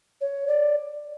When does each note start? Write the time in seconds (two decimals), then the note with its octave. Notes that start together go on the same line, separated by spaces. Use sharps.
0.21 C#5
0.47 D5